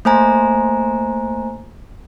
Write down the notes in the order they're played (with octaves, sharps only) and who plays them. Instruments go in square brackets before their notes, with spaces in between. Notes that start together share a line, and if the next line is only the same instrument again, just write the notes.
[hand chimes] A3 A#3 C5 G#5 A#5